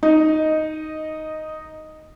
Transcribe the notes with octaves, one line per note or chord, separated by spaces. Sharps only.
D#4 D#5